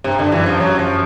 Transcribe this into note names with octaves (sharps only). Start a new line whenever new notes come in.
G2 C3
G2 D3
F#2 E3
F3
F#2 F#3
F3